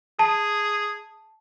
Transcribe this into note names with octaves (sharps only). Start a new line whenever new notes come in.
G#4 A5